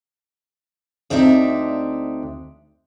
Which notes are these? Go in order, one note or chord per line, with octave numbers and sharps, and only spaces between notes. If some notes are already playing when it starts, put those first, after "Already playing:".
D2 C4 D4 D#4 E5